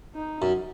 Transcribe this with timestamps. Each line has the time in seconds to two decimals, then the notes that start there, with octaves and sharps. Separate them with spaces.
0.15 D#4
0.42 F#2